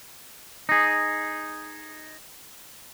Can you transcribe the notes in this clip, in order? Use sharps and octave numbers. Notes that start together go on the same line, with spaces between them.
D#4 G#4